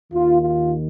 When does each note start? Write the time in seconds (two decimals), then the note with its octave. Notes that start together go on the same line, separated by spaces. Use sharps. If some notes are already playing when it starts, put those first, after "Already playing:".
0.13 D#2 D#3 F4
0.42 F4